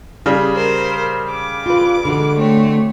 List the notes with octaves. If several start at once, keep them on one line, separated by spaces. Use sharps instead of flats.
C#3 G3 G#4
A#4 C5
D6
F4 B4
D3 G#3 F#4
A3 C4 C#5